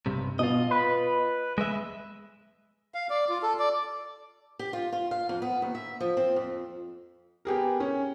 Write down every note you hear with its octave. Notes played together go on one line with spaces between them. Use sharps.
B1 G2 C3
B2 F4 D#5
B4
G#3 B4 E5
F5
D5
F4
A4
D5
G4
F4
F4
F5
F2
B3
D#2
E5
F3
C4
F2
B3 G4 G#4 A#4
C#4